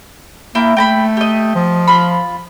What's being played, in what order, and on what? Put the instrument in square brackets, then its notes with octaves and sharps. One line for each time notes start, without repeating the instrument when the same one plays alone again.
[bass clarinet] A#3 [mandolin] E4 G5
[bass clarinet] A3 [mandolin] G5 A#5 B5
[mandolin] G4 D#5
[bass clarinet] F3
[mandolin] F4 B5